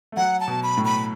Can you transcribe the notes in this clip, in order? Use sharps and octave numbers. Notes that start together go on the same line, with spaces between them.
A3
F#3 F#5
A5
B2
B5
A2
B5